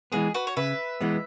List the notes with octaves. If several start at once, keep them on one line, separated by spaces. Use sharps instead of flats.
E3 G#3 B3 G#4
F#4 B4
C#5
C#3 B4 E5
E3 G#3 B3